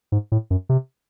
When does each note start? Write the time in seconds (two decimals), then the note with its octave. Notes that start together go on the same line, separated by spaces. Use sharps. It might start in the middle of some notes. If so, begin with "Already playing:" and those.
0.12 G#2
0.32 A2
0.50 F#2
0.69 C3